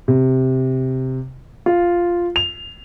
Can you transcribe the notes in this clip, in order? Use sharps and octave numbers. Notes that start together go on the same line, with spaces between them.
C3
F4
F7